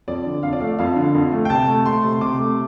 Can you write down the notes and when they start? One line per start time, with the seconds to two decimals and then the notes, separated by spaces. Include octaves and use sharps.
0.08 F2 D5
0.26 D3
0.43 F2 F5
0.53 D5
0.60 A3 F5
0.78 F2 F5
0.96 D3
1.14 F2
1.32 A3
1.45 G5
1.50 C3 A5
1.68 A3
1.86 A3 C6
2.04 C3
2.13 C6
2.21 C3 D6
2.40 A3